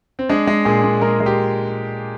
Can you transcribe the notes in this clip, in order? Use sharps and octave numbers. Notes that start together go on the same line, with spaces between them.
C4
G#3 D4
G#3
A#2 G#4
A#2
G#3 A#4
G#3
G4